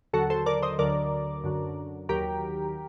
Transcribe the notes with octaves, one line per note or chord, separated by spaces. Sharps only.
D#2 D3 F#3 F#4 A4
A4 C5
A#4 D5
C5 D#5
D2 D3 F#3 A#4 D5
F#2 D3 F#3
D#2 D#3 F#3 G4 A#4